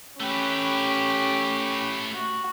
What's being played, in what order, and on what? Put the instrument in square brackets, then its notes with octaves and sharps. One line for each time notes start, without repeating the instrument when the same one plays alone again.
[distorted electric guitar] A3 B4 [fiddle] C#4 G4
[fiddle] F#4